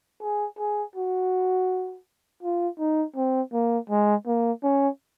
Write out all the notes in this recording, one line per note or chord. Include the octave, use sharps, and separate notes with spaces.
G#4
G#4
F#4
F4
D#4
C4
A#3
G#3
A#3
C#4